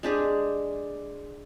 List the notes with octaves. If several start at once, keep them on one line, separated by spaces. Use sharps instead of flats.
G#3 D4 G4 G#4